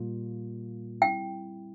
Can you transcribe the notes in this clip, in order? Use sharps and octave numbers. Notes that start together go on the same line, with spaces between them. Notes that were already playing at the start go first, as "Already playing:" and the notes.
Already playing: A#2 G3 A#3 F4
G3 C4 E4 G5